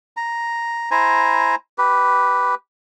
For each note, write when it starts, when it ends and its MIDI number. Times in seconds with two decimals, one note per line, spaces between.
0.17 0.89 82
0.91 1.55 64
0.91 1.55 72
0.91 1.55 80
0.91 1.55 82
1.78 2.55 67
1.78 2.55 71